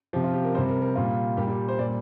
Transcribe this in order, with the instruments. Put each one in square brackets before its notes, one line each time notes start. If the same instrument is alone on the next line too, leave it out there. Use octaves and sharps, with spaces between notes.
[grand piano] C3 F3 G4
F4
G4
A#4
G3 C5
C3
A#4
A#4
A#2 G3 F4
A#2 G3 G4
G4
C5
A#2 G3 D5